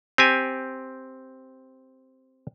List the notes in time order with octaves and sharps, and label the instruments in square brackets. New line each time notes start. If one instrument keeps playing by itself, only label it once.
[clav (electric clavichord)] C4 G4 G#5